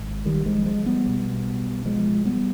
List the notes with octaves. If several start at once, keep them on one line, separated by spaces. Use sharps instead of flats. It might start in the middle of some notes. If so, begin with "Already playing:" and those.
Already playing: G#1 G#2
D#3 G3
F3 G#3
F3 G#3
G3 B3
B1 B2
F3 G#3
G3 B3